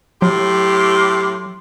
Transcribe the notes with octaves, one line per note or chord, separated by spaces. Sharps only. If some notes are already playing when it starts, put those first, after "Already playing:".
A2 F#3 G4 C6